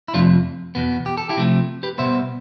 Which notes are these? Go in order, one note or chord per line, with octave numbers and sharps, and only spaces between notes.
E4
F2 C3 F3 A3 D4 F4
E2 B2 B3
G4
A4
E4 G4
C3 F3 A3
G4 B4
B2 G3 B3 C5 E5